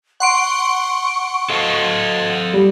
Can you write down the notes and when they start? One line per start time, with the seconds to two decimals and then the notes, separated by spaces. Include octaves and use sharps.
0.20 F#5 C6 C#6 D7
1.50 A4 D#5 F5
2.53 G3